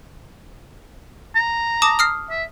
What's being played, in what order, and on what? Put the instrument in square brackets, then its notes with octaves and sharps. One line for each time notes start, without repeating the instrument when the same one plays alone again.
[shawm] A#5
[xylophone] A5 D6 D#6
D#6 F6 C7
[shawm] E5